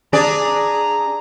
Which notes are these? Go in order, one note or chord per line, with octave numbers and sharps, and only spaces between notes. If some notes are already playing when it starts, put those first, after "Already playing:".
D4 G#4 D5 A#5